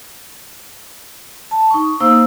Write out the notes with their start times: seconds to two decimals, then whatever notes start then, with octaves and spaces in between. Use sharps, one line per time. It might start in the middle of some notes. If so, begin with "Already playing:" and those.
1.51 A5
1.71 D#4 C#6
2.00 A#3 D#4 C5 F5 E6